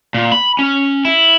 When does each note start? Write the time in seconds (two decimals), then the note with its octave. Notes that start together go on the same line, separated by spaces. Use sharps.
0.14 A#2
0.32 B5
0.59 C#4
1.05 E4